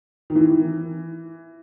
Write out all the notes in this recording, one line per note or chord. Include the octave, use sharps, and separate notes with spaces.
D#3
E3